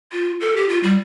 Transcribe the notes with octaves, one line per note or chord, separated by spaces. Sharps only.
F4
A4
G4
F4
G3